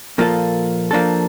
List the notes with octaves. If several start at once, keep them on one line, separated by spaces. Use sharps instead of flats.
A#2 F3 A#3 F4 A4
F3 A#3 D4 A4